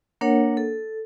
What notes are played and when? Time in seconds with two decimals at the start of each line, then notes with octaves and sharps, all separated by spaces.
0.21 A#3 D4 A#4 C#5 F#5
0.57 A4